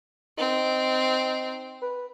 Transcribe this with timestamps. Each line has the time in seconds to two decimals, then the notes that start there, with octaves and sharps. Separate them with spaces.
0.38 C4 D#4
1.82 B4